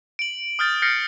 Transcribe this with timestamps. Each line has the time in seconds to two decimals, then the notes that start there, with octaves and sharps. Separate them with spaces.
0.19 D7 F#7
0.59 D#6 F6 G6 A6
0.82 F6 G6 A6 A#6 C7 C#7